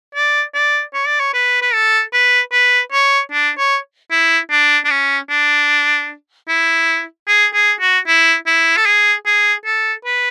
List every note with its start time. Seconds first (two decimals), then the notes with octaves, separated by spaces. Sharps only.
0.15 D5
0.54 D5
0.94 C#5
1.07 D5
1.20 C#5
1.34 B4
1.62 B4
1.74 A4
2.13 B4
2.52 B4
2.92 C#5
3.32 D4
3.58 C#5
4.11 E4
4.50 D4
4.85 D4
4.90 C#4
5.30 D4
6.48 E4
7.28 G#4
7.54 G#4
7.81 F#4
8.07 E4
8.47 E4
8.77 A4
8.86 G#4
9.26 G#4
9.65 A4
10.05 B4